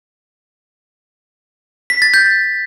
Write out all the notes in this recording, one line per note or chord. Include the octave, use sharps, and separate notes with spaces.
B6
A6
G6